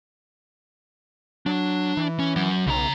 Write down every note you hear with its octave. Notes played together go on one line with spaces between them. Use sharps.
F#3 D4
E3
C#4
F#3 C#4
B1 C#3 A#5